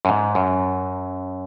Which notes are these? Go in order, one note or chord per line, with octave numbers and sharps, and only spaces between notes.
F#2
G#2
F#2